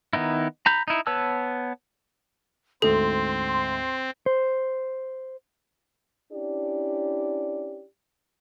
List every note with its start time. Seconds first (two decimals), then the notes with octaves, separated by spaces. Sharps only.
0.13 D#3 B3 D#4 E4
0.66 A#5 B5 G6
0.88 D#4 E4
1.07 B3 B4 C#5 A5 E6
2.82 D2 G#2 C4 A4 C6
4.26 C5
6.32 C#4 D4 E4 G4 D5